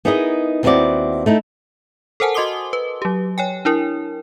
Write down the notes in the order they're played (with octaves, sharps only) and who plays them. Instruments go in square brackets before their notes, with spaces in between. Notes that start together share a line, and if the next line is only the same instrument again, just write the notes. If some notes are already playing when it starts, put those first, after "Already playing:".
[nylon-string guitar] B3 D#4 E4 G#4 A#4 D#5
D#2 B3 C4 E4 F#4 D5
A3 D#4 E4
[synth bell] A4 A#4 C5 F#5 G#5 A5
F#4 D#5 C6 D6 D#6 G7
B4
F#3 G4
C#5 G5 G#5
D4 E4 A#4